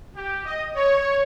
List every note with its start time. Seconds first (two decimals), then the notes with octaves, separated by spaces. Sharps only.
0.15 G4
0.45 D#5
0.75 C#5